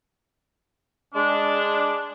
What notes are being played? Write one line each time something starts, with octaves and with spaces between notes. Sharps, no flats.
G#3 D4